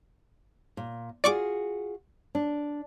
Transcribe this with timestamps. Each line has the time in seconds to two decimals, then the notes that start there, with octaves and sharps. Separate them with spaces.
0.77 A#2
1.24 F4 F#4 G#4 D5 C#6 D6
2.35 D4